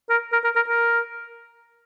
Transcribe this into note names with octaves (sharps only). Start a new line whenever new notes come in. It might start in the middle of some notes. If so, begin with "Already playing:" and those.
A#4
A#4
A#4
A#4
A#4